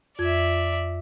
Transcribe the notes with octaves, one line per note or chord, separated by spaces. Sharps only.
F2 F4 D5 E5 G#6